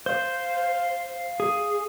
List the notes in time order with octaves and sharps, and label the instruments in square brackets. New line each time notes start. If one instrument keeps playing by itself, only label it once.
[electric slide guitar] C5 [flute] F5
[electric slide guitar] G#4